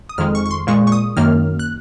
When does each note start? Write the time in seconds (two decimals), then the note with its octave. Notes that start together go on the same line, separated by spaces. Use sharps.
0.09 D#6
0.18 F2 D#3 G#3 F6
0.35 C#6
0.46 C#6
0.51 C6
0.67 A#2 G#3 C#6
0.87 C#6
0.92 D#6
1.17 F#2 D#3 A#3 F6
1.59 F#6